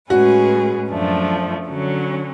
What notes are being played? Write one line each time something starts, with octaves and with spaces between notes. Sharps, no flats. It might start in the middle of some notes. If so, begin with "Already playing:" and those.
A2 G#3 C#4 F#4 G#4 B4
F#2 F3 A3 D4
D3 F#3 C#4